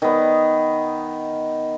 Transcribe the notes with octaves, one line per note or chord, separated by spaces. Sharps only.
D#3 B3